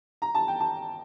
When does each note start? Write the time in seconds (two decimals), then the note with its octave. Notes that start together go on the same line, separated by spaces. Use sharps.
0.22 A#5
0.35 A5
0.48 G5
0.60 A5